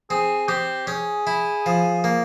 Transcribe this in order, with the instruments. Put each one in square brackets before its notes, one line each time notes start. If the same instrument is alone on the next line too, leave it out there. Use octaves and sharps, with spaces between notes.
[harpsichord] C4 [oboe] G#4
[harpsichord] C4 [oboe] G4
[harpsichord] C#4 [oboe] G#4
[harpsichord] E4
F3
A#3